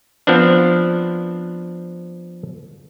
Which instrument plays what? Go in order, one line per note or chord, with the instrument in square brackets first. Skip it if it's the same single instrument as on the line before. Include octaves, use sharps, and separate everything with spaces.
[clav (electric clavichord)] F3 B3 C4 D4